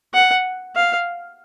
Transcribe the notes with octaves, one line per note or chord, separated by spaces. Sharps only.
F#5
F5